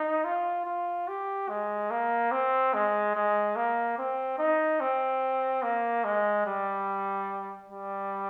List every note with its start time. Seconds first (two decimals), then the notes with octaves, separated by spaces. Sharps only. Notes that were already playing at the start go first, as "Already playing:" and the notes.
Already playing: D#4
0.25 F4
0.66 F4
1.08 G4
1.49 G#3
1.91 A#3
2.32 C4
2.74 G#3
3.15 G#3
3.56 A#3
3.98 C4
4.39 D#4
4.80 C4
5.63 A#3
6.04 G#3
6.46 G3
7.70 G3